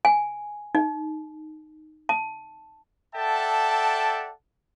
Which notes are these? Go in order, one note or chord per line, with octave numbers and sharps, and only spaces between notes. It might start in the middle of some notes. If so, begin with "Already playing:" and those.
G#5
D#4
A5
A4 D5 E5 F#5 G5 A5